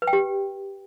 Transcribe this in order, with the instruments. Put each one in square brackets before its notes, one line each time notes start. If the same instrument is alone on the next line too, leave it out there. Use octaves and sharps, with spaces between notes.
[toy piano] B4
G5
G4